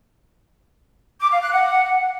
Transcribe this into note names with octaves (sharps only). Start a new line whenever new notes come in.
D6
F5
F#6
F#5